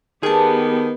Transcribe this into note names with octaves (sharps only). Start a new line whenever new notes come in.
D#3 B3 G4 G#4 G5 A5